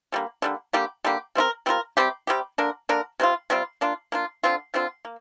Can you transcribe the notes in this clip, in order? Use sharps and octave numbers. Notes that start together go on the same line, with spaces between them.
D3 G3 A#3
D3 G3 A#3
D3 G3 A#3 G4
D3 G3 A#3 G4
G3 C4 F4 A#4
G3 C4 F4 A#4
C3 G3 C4 G4
C3 G3 C4 G4
D3 A#3 D4 A#4
D3 A#3 D4 A#4
C3 G3 C4 F4
C3 G3 C4 F4
A#3 D4 F4
A#3 D4 F4
D3 F3 C4 F4
D3 F3 C4 F4
A#3